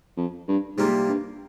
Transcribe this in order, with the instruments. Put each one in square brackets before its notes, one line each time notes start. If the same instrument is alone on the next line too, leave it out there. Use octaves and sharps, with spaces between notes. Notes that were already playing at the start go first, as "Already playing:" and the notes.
[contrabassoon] F2
G2
[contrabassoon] G#2 [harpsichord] C3 G3 A#3 F4
[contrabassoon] G2